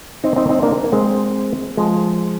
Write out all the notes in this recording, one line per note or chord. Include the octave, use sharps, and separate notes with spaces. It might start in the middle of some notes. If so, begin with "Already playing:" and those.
C4 D#4
C4 D#4
C4 D#4
A#3 D4
C4
A#3
G#3 C4
F3 G#3